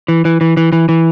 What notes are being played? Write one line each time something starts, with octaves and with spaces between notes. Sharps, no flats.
E3
E3
E3
E3
E3
E3